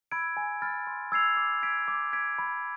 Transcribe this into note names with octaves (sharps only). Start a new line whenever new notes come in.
B5 E6 G#6 D7
G#5
B5 F6 A6
C6
E6 G#6 C7 F7
D6
G#6 B6 D7
D6
G#6 B6 D7
B5